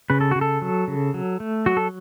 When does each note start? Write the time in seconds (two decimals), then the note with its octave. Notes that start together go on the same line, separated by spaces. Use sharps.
0.10 C#3 B4
0.21 A4
0.31 C#3 F#4
0.41 A4
0.62 F#3
0.88 C#3
1.14 F#3
1.40 A3
1.66 F#3 F#4
1.77 A4